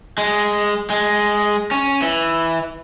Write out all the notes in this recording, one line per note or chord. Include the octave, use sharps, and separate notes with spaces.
G#3
G#3
C#4
E3